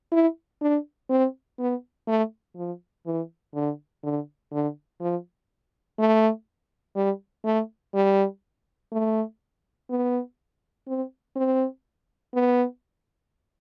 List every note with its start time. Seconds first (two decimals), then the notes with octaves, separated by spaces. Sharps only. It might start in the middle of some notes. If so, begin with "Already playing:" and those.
0.12 E4
0.62 D4
1.10 C4
1.59 B3
2.07 A3
2.56 F3
3.06 E3
3.55 D3
4.03 D3
4.52 D3
5.00 F3
5.99 A3
6.96 G3
7.45 A3
7.94 G3
8.92 A3
9.90 B3
10.87 C4
11.36 C4
12.34 B3